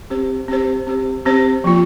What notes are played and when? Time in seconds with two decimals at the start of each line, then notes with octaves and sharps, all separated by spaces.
0.10 C4 G4 C5
0.48 C4 G4 C5
0.87 C4 G4 C5
1.25 C4 G4 C5
1.64 F3 A#3 F4